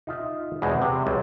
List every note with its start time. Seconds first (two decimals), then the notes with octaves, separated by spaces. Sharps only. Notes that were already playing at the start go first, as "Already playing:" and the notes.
0.07 D#4 F4 E5
0.62 E2 B2 G#3 C4
0.82 C3
1.06 C#2 F#3 G3